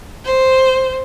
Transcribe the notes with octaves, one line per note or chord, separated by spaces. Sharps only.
C5